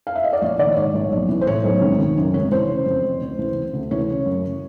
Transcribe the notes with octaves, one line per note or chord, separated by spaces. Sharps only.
F5
E5
D#5
D5
A#1 C#5
D#3 D5
G#2 C#5
A#1
B1
E3
C5
A2 C#5
B1
G#1
D#3
F#2
G#1 C#5
E3 C5
C#3
F2
F1
D2
E3
C3
D2
E3 C#5
C#3
F#2